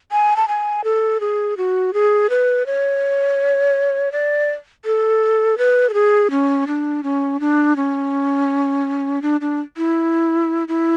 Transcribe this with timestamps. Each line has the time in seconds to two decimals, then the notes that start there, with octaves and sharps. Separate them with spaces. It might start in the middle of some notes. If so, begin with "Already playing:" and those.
0.12 G#5
0.36 A5
0.48 G#5
0.84 A4
1.20 G#4
1.57 F#4
1.94 G#4
2.30 B4
2.66 C#5
4.12 D5
4.85 A4
5.58 B4
5.89 A4
5.94 G#4
6.31 C#4
6.67 D4
7.03 C#4
7.40 D4
7.76 C#4
9.22 D4
9.41 D4
9.77 E4
10.68 E4